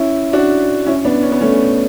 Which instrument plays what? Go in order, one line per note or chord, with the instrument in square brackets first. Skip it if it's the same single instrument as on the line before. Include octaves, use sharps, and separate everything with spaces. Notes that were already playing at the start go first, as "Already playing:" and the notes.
Already playing: [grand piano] C#4 E4
D4 F#4
C#4 E4
B3 D4
C#4
B3
A3 C#4